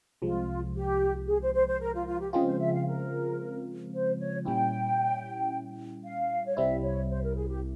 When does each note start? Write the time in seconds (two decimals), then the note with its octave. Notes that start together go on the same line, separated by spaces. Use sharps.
0.22 C2 C3 F3 G#3 F4
0.75 G4
1.28 G#4
1.41 C5
1.54 C5
1.67 C5
1.81 A#4
1.94 F4
2.07 F4
2.20 G4
2.33 C#3 F3 G#3 C4 F4 G#4
2.47 C5
2.60 E5
2.73 F5
2.87 A#4
3.93 C5
4.19 C#5
4.45 A#2 G3 C#4 E4 G5
6.04 F5
6.46 C#5
6.57 C2 C3 G3 C4 E4 E5
6.83 C#5
7.10 C5
7.23 A#4
7.36 G#4
7.49 G4